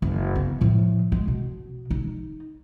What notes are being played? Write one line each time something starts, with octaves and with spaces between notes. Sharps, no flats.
F#1
C#3 B3
A2 F3
G#3
B2
D#4